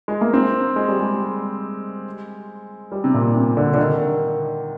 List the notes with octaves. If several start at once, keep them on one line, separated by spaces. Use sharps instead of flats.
G#3
A#3
C4
G#3
G3
G#3
G3
C3
A#2
C3
D3
D3
D#3